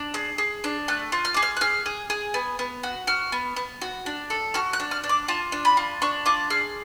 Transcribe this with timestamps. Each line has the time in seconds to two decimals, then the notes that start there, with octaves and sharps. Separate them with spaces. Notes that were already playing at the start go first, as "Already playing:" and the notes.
Already playing: D4
0.14 G#4
0.38 G#4
0.64 D4
0.88 A3 F#6
1.12 F4
1.25 F6
1.34 G#4 D6
1.42 F6
1.57 F#6
1.61 G#4 F6
1.86 G#4
2.10 G#4
2.34 B3
2.59 B3
2.83 F#4
3.07 F#4 F6
3.32 B3
3.56 B3
3.81 F#4
4.06 D4
4.30 A4
4.54 F#4 F6
4.73 F#6
4.80 D4
4.91 F6
5.04 D4
5.09 D6
5.28 F4 A5
5.52 D4
5.65 B5
5.77 F4
6.02 D4 C#6
6.26 F4 D6
6.50 G#4 F6